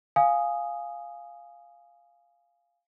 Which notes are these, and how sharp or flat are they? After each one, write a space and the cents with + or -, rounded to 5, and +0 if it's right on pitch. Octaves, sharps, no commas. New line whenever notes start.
F5 +0 G#5 +0 D#6 +0